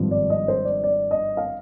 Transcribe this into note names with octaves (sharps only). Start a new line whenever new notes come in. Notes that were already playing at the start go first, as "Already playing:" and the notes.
Already playing: G#1 G2 F3
D5
D#5
C5
D5
D5
D#5
F5